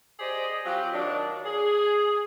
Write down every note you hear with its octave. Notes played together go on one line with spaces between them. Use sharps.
G4 G#4 C5 D5 D#5
F#3 C4 F4 G4
D#3 F#3 D4
G#4